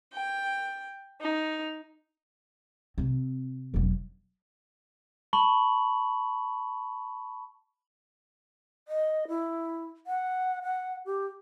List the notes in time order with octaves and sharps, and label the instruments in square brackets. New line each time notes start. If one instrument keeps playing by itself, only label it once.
[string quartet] G5
D#4
[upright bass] C3 C4
E1 F#2
[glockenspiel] A5 B5 C#6 F#7
[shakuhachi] D#5
E4
F#5
F#5
G4